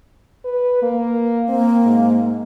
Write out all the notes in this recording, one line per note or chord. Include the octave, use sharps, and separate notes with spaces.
B4
A#3
A#3 C4
G#2